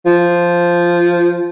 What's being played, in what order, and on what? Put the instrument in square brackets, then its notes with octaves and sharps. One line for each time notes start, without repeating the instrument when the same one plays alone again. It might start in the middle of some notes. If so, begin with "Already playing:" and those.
[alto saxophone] F3